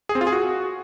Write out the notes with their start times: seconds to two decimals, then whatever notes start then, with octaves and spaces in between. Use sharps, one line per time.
0.09 G#4
0.15 C4
0.21 F4
0.27 G#4
0.33 F#4